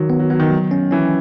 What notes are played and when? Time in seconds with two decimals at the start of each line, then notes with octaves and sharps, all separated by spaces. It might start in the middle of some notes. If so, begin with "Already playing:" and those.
Already playing: D#3 F#3
0.10 B3
0.19 F#3
0.30 F#3 B3
0.40 D#3
0.50 F#3
0.71 C#4
0.91 E3 C#4